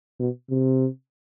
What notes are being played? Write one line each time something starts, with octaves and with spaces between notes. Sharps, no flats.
B2
C3